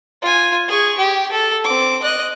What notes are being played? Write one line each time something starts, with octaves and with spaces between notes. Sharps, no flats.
F4 G#5
G#4 C#6
G4
A4
C4 D6
D#5 F#6